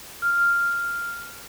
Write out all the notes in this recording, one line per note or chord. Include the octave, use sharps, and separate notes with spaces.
F6